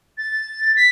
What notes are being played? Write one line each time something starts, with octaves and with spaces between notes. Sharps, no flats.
A6
B6